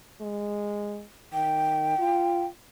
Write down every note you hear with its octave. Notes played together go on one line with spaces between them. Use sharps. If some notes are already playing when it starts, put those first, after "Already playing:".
G#3
D#3 G5
F4